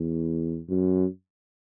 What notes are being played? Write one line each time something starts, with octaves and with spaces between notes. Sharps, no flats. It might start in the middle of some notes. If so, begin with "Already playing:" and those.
Already playing: E2
F#2